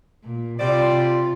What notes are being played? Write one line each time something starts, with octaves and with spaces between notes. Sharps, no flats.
A#2
C3 G3 F4 C5 D5